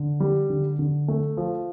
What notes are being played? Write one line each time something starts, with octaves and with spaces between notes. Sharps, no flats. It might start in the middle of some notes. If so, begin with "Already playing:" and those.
Already playing: D3
G3
D3
D3
A3
F3